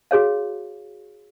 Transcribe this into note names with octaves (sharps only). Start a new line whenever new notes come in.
F#4 G#4 C#5 F5